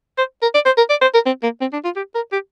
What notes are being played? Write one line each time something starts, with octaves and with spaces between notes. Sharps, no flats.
C5
A#4
D5
C5
A#4
D5
C5
A#4
C4
A#3
C4
D4
F4
G4
A#4
G4